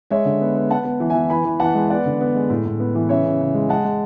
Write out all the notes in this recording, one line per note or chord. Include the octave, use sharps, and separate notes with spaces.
G#3 C#5 E5
D3
B3
B3
B3 F#5 A5
B3
E3
E5 G#5
E3
E3 G#5 B5
E3
E3 F#5 A5
G#3
B3 D5 F#5
D3
B3
G#3
A2
A2
B3
E3
C#3 C#5 E5
C#3
C#3
G#3
G#3 F#5 A5
G#3